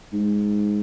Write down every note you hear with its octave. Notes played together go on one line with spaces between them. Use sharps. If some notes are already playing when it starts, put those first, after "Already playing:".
G#2